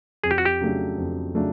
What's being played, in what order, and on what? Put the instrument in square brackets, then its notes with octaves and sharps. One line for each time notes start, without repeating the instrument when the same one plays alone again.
[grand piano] F2 [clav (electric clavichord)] G#4
[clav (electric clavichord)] G4
F#4
G4
[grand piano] C#3 F#3 A3 D4
F2
C#3 F#3 A3 D4